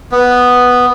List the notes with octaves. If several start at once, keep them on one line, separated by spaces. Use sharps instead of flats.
B3